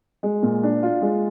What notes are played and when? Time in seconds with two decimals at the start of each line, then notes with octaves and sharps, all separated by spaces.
0.23 G#3
0.43 A#2
0.63 D4
0.83 F4
1.02 G#3